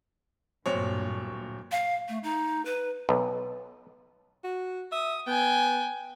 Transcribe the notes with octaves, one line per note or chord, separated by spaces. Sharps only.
D1 G2 A#2 C4 C#5
F5
A3
D#4
B4
B1
F#4
E5 D#6
B3 G5 G#5